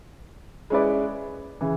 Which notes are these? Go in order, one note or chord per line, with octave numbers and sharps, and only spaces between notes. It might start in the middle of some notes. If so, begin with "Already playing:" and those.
G#3 C#4 E4 B4 D5
C#3 E3